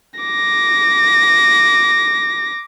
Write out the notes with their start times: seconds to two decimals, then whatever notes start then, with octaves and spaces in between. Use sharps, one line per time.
0.20 D6 A#6